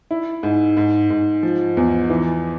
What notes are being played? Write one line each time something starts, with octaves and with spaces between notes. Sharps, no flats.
E4
G#2
G#2
G#2
F3
E2
E3